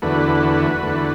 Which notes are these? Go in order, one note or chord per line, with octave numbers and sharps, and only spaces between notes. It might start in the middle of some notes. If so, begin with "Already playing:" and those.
E2 D3 A3 F#4 B4
E2 D3 A3